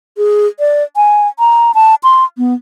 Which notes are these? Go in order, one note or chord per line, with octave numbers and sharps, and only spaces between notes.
G#4
D5
G#5
A#5
A5
C6
B3